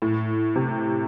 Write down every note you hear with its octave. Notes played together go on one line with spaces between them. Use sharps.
A2
C3